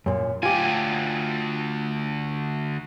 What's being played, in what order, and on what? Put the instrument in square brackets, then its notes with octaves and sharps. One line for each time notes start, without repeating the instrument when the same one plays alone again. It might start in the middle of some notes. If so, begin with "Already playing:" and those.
[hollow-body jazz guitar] F#2 A#2
[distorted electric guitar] D2 G#5 [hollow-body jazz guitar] F4 G4